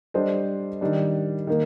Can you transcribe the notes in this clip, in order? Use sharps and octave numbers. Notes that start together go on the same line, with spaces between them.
G3 D4 A4 C5 D#5
D#3 G3 D4
D#3 A#3